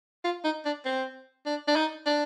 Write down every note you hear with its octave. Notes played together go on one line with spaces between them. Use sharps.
F4
D#4
D4
C4
D4
D4
D#4
D4